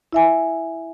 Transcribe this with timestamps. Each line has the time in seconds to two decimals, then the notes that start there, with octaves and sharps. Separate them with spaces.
0.13 E4 E5 G#5